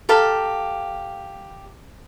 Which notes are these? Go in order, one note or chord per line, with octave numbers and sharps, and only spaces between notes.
G4 A4 F5 A#5